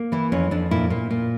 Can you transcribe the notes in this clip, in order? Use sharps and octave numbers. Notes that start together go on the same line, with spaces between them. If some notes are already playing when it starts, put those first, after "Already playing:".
Already playing: A#3
E3 E4
F2 C#4
F2 D4
A#2 E4
A#2
A#2